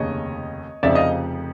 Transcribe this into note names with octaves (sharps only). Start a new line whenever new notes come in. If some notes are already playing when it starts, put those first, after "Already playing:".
Already playing: F1 D#2 C#3 C#5 D#5
F1 F2 C#3 F3 D5 E5
D#5 F5